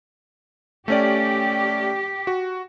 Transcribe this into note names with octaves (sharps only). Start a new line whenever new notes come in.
A3 C#4 G4 D5
F#4